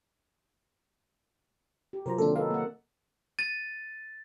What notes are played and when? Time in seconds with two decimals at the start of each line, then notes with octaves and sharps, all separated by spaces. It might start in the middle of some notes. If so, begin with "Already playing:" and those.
1.93 G4
2.06 C3 F#3 F4 A#4 C5 A#5
2.18 D#3 A#3 C4 D4 A4
2.36 D#4 A4 B4 F5
2.50 A#3 F#5
3.39 A6 D#7